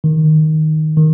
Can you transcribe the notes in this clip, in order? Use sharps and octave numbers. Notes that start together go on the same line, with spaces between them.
D#3
D#3